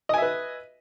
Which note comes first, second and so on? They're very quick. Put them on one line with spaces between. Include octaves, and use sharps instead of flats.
D#5 G#5 E5 B4